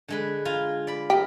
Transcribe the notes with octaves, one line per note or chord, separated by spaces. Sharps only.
D3 G#3 B4
F4 G#5 A#5
D5 B5
G4 A#4 D#5 B5